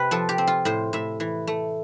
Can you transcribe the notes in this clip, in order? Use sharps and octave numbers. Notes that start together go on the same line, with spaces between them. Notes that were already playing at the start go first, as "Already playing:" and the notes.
Already playing: C3 B4
F3 A4
G4
C4
F4
A2 C5
A2 E5
E3
A3